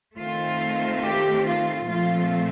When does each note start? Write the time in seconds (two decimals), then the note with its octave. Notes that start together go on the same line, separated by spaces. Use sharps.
0.18 D#3 A3 C4 F4
1.02 G4
1.45 F4
1.87 A#2 F3 A3 C4 F4